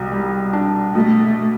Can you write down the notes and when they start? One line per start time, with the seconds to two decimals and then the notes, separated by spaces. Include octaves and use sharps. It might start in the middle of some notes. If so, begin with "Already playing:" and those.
Already playing: C2 B2
0.12 G3
0.53 D4
0.95 B2 A3